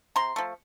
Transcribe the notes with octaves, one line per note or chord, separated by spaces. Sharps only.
C3 A#5 C6
F3 A3